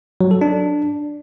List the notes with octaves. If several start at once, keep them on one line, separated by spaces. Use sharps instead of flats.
F#3
A4
D4